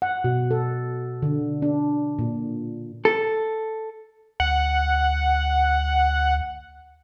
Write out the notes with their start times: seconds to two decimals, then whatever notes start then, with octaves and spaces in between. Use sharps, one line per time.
0.02 F#5
0.24 B2
0.51 A4
1.22 D3
1.62 D4
2.19 A#2
3.05 A4
4.40 D2 F#5